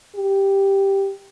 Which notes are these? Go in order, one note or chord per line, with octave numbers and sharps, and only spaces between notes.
G4